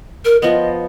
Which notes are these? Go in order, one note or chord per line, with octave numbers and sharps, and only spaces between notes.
A#4
F3 B3 D#5